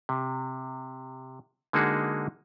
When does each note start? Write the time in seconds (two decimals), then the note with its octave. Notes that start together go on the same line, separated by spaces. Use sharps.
0.09 C3
1.73 D3 G#3 A#3 D#4 F#4 G#4